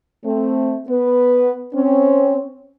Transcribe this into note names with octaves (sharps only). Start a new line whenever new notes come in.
A3 C4
B3 B4
C4 C#4